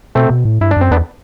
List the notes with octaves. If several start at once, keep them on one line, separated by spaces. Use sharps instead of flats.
B2 A3 C4
B2
A2
G2 E4
D4
F#2 C4
E2 B3 D4